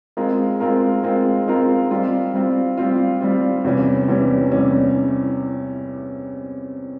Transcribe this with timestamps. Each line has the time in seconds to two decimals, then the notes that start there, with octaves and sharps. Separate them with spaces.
0.17 G#3 C4 F4 A#4
0.60 G#3 C4 F4 A#4
1.03 G#3 C4 F4 A#4
1.48 G#3 C4 F4 A#4
1.91 G3 C4 F4
2.34 G3 C4 F4
2.77 G3 C4 F4
3.21 G3 C4 F4
3.64 E2 C3 E3 G3 C#4
4.08 E2 C3 E3 G3 C#4
4.52 E2 C3 E3 G3 C#4